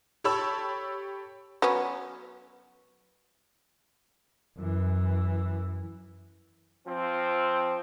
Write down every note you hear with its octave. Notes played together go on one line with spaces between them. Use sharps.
G4 A4 C#5 B5 E6
F#3 B3 C#4
F#2 E3
F3 C4